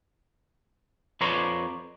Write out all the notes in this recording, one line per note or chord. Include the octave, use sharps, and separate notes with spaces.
F2 B4 C#5 D5 A#5 C6